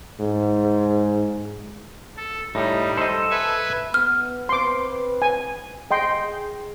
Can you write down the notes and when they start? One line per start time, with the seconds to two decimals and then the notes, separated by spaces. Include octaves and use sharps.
0.20 G#2
2.17 A4
2.55 A2 G3 D#4
2.98 A4 C5 D#5
3.30 B4 E5 G#5
3.94 B3 F6
4.49 C4 B4 C6 D6
5.22 G#5
5.91 G#4 D#5 G5 C6